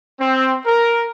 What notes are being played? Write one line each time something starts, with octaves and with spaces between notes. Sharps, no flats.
C4
A#4